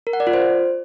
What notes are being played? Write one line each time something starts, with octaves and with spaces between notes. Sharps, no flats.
A#4
F#5
D5
F4
C5